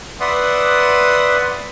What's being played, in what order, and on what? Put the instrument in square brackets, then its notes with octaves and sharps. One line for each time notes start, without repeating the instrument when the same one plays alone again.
[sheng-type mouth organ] B4 D5 E5 F#5 C6 D#6